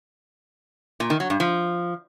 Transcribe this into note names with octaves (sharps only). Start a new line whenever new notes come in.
A#2
D#3
F#3
G2
F3